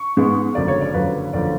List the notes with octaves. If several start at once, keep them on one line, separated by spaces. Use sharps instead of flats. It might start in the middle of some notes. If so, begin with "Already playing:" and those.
Already playing: C#6
G#2 G#3 B3
F#1 F#2 D3 F3 D5
C#5
D5
F#1 F#2 D3 F3 B4
F#1 D3 F3 D5